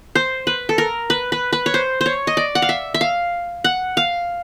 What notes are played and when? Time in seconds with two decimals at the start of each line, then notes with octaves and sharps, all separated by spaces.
0.15 C5
0.47 B4
0.69 A4
0.78 A#4
1.10 B4
1.32 B4
1.53 B4
1.66 C#5
1.74 C5
2.01 C5
2.06 C#5
2.27 D#5
2.37 D5
2.55 F#5
2.62 F5
2.69 E5
2.94 E5
3.01 F5
3.64 F#5
3.97 F5